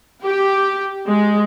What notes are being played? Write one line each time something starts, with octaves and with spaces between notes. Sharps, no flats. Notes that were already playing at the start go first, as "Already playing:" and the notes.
G4
G#3